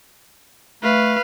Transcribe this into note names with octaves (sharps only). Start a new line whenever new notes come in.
A3 B4 F5